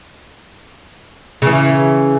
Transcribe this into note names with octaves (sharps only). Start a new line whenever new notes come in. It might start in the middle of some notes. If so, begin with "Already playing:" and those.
C#3 E3